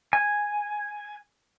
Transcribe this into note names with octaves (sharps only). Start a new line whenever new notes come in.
G#5